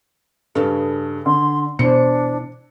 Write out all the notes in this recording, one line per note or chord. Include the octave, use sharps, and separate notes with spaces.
G2 C#3 A4
D3 C6
E2 B2 E3 D4 C5 C#7